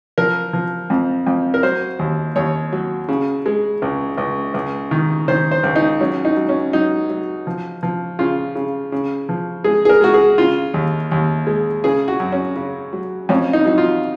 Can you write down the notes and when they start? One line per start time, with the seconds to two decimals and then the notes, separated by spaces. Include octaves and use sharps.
0.18 F3 A#4
0.53 F3
0.90 F2
1.27 F2
1.54 A#4
1.63 F#3 C5
1.99 D#2
2.36 D#2 C#5
2.73 F#3
3.09 C#3
3.46 G#3
3.82 C#2
4.17 C#2
4.54 C#2
4.91 D#3
5.28 D#3 C5
5.51 C5
5.63 C#2
5.76 D#4
6.01 F#3 C#4
6.25 D#4
6.37 F#3
6.49 C#4
6.73 F#3 D#4
7.09 F#3
7.47 F3
7.83 F3
8.19 C#3 F4
8.55 C#3
8.92 C#3
9.29 F3
9.64 G#3 G#4
9.85 G#4
9.89 A#4
10.01 G#3 F#4
10.14 G#4
10.38 C#3 F4
10.74 D#2
11.11 D#2
11.47 G#3
11.84 C#3 G#4
12.08 F#4
12.20 F#2
12.32 C#4
12.56 C#3
12.93 F#3
13.29 F2 C#4
13.53 D#4
13.66 F#3 D#4
13.78 F4